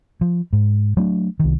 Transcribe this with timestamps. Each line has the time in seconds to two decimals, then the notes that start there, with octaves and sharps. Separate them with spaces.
0.21 F3
0.53 G#2
0.97 F#3 A3 D4
1.39 C2 D#3